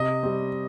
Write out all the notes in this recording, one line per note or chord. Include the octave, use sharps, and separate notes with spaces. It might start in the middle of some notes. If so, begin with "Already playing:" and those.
Already playing: C3 D#5
G3 C4